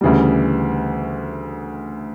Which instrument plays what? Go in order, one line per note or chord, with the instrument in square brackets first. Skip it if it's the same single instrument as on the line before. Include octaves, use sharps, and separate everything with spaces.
[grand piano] D2 C#3 E3 G3